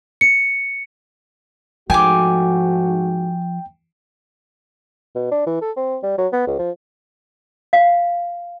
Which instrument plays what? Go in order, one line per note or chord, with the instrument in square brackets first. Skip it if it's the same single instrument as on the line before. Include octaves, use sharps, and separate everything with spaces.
[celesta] C#7
[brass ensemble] G#2 A3 F#4 [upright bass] F3 [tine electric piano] G5 [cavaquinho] G#5 D6
[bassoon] B2
D4
E3
A4
C4
G3
F#3
B3
C#2
F3
[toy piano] F5